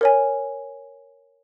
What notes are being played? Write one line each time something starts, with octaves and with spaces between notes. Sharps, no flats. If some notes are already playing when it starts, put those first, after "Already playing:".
A#4 C#5 G#5